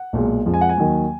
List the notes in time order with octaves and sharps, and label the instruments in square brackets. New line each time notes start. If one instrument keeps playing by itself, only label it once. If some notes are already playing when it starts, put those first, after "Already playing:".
Already playing: [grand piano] F#5
B1 A#2 G#3
F2 F3 G#3
G#5
F#5
G#5
D#2 D#3 F#3